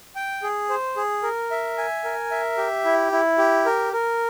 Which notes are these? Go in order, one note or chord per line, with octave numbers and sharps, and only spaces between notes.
G5
G#4
C5
G#4
A#4
E5
G#5
A#4
E5
G4
E4
E4
G4
A#4
A#4